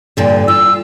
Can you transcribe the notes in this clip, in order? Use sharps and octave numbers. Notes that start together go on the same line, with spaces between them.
G2 A#2 D3
F4 E6